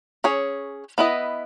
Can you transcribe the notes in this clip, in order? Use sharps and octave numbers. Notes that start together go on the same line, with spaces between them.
C#4 G#4 C#5
B3 E4 B4 D#5